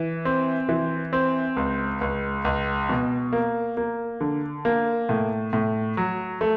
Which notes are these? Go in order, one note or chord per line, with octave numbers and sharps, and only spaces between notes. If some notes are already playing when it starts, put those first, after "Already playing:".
Already playing: E3
C4
E3
C4
C#2
C#2
C#2
B2
A#3
A#3
D3
A#3
A2
A2
F#3
A3